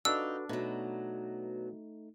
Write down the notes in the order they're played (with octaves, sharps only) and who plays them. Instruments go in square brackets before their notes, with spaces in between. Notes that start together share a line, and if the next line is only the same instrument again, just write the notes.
[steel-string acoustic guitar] F2 D#4 [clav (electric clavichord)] D4 [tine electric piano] F#4 A4 B4 [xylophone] E6
[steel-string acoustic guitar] B2 F#3 [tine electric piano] A3 D#4